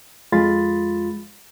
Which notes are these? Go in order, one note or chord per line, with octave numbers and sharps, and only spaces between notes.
F2 G#3 F4 B5 C6 A6